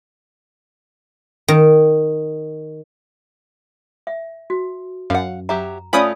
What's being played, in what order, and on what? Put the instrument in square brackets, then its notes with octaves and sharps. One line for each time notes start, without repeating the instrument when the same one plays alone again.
[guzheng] D#3
[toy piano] E5
F#4
[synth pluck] F#2 [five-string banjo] F5 F#5
[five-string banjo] F#3 G4 E5 [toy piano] A#5
[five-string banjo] A3 C#4 F4 [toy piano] D5 G#5 [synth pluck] B5 D#6